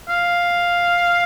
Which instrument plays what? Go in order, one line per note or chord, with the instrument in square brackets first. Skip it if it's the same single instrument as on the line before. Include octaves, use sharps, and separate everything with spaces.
[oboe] F5